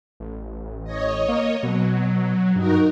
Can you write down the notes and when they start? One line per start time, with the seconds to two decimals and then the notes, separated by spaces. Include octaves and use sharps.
0.20 A1
0.84 C#5 D#5
1.29 A#3
1.63 B2 F#3
2.56 G2 D#4 F#4 A#4